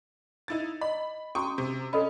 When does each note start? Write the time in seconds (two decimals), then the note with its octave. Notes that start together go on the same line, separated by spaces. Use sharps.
0.48 D#4 E4 A6
0.81 D#5 B5
1.35 C#4 F#4 G5 A#5 C#6 D#6
1.58 C3
1.93 C#4 A4 D#5 B5